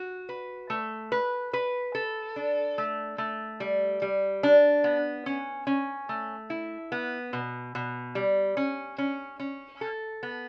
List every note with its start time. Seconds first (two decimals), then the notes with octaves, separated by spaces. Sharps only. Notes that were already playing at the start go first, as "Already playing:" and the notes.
Already playing: F#4
0.29 B4
0.70 A3
1.12 B4
1.53 B4
1.95 A4
2.36 D4
2.78 A3
3.18 A3
3.60 G3
4.02 G3
4.43 D4
4.84 B3
5.26 C#4
5.67 C#4
6.09 A3
6.50 E4
6.92 B3
7.33 B2
7.75 B2
8.15 G3
8.57 C#4
8.98 C#4
9.40 C#4
9.81 A4
10.23 B3